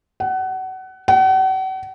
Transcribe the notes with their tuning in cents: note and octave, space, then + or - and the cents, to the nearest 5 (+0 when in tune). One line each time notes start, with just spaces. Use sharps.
F#5 +25
F#5 +40